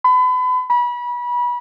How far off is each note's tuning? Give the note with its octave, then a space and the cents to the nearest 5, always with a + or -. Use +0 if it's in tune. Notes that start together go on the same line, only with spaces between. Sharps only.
B5 +35
B5 -30